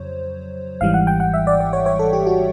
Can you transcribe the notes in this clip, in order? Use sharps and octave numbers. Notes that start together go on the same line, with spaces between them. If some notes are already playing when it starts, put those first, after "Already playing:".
Already playing: F2 C#3 F#3 C5 C#5
G#1 G#2 E3 G3 F5
F#5
G5
F#5
E5
D5
D5
C#5
C#5
A4
G4
F#4